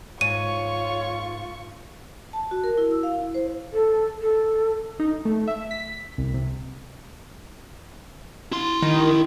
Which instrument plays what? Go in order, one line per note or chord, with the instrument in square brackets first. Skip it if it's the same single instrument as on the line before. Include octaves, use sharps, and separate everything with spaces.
[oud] G#2 [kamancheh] F4 C#6 [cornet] C#5 [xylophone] D#7
[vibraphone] A5
F#4
A#4
E4
E6
F5
E4
C5
[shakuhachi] A4
A4
[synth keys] D#4
A3
E5
B6
C2
C3
[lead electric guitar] E4 C6
[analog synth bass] D#3